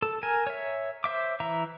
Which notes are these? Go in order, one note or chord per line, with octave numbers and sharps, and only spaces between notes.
A4
A#4 G#5
C#5 E5
C5 E5 D6
E3 E5 A#5